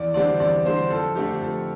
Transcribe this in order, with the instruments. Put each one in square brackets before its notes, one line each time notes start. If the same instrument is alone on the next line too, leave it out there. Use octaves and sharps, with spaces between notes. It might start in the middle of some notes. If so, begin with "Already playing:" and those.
Already playing: [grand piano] E2 D5
D3 G3 C4 D5
E2 D5
D3 G3 C4 C5
F2 A4
D3 A3 C4 G4
F2 A4